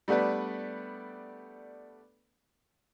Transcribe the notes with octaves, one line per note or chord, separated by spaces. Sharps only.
G3 A3 B3 D4 B4